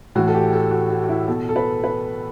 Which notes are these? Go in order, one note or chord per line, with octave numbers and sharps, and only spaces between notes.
A2 E3 F#4
A4
G4
A4
F#4
F#4
F#4
E4
B2 A4
A4
B4
B4